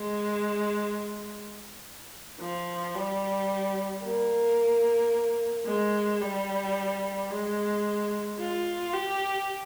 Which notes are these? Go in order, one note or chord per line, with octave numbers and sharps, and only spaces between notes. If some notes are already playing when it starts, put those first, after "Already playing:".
Already playing: G#3
F3
G3
A#3
G#3
G3
G#3
F4
G4